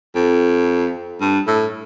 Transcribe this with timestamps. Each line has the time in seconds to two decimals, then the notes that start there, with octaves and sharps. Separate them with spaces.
0.15 F2
1.21 G2
1.47 A2